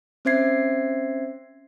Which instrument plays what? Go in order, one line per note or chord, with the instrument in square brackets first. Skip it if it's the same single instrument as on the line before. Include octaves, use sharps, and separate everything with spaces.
[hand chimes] C4 C#4 C5 E5 G#6 C7